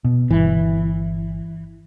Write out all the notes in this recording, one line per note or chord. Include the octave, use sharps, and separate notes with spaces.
B2
G1 E3